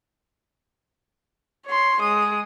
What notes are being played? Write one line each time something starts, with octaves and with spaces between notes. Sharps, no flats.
C#5 C6
G#3 D#6